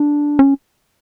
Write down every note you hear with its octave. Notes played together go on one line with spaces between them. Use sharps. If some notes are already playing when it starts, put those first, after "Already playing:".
Already playing: D4
C#4